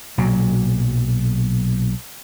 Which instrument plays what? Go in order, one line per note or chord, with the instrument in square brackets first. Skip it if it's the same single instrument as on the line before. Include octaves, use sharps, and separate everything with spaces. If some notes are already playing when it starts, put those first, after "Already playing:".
[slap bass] B1 A#2 F#3